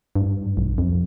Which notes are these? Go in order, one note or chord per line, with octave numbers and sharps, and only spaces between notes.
G2
B1
F2